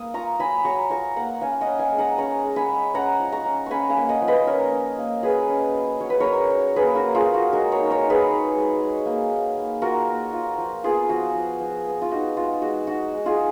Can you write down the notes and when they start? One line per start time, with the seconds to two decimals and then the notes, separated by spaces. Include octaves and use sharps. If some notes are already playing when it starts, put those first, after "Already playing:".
Already playing: A#3 D#6
0.14 F4 A#5 C#6
0.39 F#3 G#5 B5
0.64 F#3 A#5 C#6
0.90 F4 A#5 C#6
1.16 A#3 F#5 A#5
1.41 C#4 F5 G#5
1.61 D#5 F#5
1.66 C#4
1.79 F5 G#5
1.92 G#3
1.98 F#5 A#5
2.18 C#4 A#5 C#6
2.44 G#3
2.56 G#5 B5
2.68 G#3
2.94 C#4 F#5 A#5
3.19 F3
3.32 A#5 C#6
3.46 C#4
3.66 C#4 G#5 B5 C#6
3.90 F5 G#5
3.97 A#3
4.09 D#5 F#5
4.21 F3
4.27 B4 D#5
4.47 C#4 A#4 C#5
4.72 C#4
4.98 A#3
5.23 F#3 G#4 B4
5.49 C#4
5.75 F#3
6.00 F#3 C#5
6.10 B4
6.20 F#3 A#4 C#5
6.51 F#3
6.76 A#3 G#4 B4
6.95 F#4 A#4
7.02 A#3
7.14 F4 G#4
7.27 A#3
7.34 F#4
7.53 G#3 F#4 A#4
7.72 A#4 C#5
7.79 D#4
7.90 A#4 C#5
8.03 D#4
8.10 G#4 B4
8.29 G#3
8.55 G#3
8.81 G#3
9.05 A#3
9.31 A#3
9.57 A#3
9.82 F4 F#4 A#4
10.08 A#3
10.33 F4
10.58 F3
10.84 B3 F4 G#4
11.09 F3 F#4
11.34 F3
11.60 F3
11.86 B3
12.02 F4
12.11 D#4 F#4
12.36 G#3 F4
12.62 G#3 F#4
12.87 D#4 F#4
13.13 G#3
13.26 F4 G#4